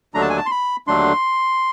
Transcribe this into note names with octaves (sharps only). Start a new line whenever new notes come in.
D#2 D3 F#3 A3 D4 A#5
A5
G#5
A5
C6
B5
D#2 D3 F#3 A3 D4 C6